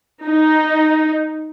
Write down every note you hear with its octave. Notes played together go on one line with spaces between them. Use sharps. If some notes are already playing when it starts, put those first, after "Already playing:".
D#4